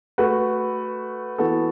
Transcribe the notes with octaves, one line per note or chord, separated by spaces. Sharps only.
A3 F#4 B4
E3 B3 F#4 A4